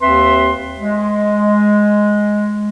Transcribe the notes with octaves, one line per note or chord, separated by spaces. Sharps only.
D#2 C4 B4 E5 C6
G#3